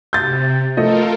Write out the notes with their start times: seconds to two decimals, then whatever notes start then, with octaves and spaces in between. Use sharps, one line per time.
0.13 C3 G6 A6
0.77 F3 A3 F4 A4 A#4 D#5